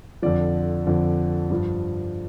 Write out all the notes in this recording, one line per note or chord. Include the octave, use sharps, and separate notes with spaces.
F2 D3 F3 D5
F2 D3 F3
G2 F3